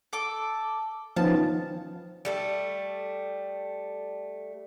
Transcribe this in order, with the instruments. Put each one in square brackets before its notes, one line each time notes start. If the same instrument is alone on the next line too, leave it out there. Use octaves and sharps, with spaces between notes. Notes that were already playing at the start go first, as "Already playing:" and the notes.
[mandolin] A4 D6
[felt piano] D#3 B3 C#4 [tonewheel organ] F3 [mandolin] A5
[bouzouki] G3 A3 A4